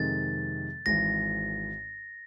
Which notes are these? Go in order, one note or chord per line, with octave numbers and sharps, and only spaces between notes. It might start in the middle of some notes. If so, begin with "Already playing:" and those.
Already playing: F2 C3 D#3 G#3 A6
G#1 G#2 E3 A#6